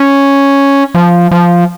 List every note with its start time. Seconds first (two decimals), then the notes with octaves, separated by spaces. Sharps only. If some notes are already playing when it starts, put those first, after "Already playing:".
Already playing: C#4
0.95 F3
1.31 F3